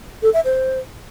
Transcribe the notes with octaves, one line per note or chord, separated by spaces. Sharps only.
A4
E5
C5